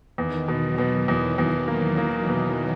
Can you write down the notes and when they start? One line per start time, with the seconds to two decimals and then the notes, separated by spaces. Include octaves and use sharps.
0.18 E2 D#3
0.48 B2
0.63 F#3
0.78 B2
1.08 E2 E3
1.38 E2
1.68 A#3
1.98 A#3
2.29 B2